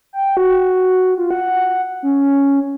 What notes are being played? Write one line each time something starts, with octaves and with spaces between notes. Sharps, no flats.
G5
F#4
F4
F#5
C#4